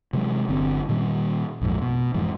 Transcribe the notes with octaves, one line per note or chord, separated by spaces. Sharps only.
C3 E3 F#3 G#3
G1 D3 C4
A#2 D#3 G3
A#1 F2 G#2
B2
F2 G#2 E3